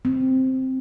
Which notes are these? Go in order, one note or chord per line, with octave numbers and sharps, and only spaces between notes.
C4